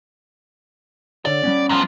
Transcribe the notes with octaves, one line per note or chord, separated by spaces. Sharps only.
D3 C#5 D5
G3 B3 C#4
F#2 F3